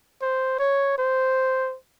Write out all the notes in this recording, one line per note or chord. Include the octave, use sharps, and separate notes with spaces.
C5
C#5
C5